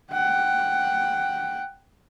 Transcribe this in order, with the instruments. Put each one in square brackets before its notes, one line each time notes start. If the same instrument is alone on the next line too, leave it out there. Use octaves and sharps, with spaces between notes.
[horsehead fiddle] F#5 G5